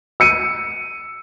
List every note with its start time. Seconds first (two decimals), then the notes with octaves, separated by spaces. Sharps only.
0.20 E6 C#7 D#7